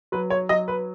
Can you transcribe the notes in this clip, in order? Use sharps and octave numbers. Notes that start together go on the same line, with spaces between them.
F#3 B4
C#5
F#3 D#5
B4